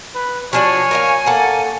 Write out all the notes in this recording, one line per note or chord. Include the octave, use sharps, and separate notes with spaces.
B4
F3 D4 F#4 C#5 G#5
A#4 D#5 F5
A#3 A4 F#5